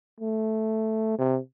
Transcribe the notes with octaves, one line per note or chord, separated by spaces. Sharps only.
A3
C3